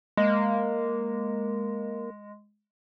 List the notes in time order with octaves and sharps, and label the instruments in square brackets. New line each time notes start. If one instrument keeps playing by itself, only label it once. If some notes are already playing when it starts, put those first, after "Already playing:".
[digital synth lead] G#3 [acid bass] A#3